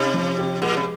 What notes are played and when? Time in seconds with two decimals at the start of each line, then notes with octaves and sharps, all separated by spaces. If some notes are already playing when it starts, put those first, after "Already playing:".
Already playing: C3 D#4
0.14 F3
0.38 G4
0.62 A#2 G#3
0.77 C3